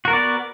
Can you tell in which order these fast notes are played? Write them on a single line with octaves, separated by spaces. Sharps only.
F#4 A#4 B3 D5